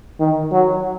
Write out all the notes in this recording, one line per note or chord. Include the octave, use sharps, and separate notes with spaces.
D#3
F#3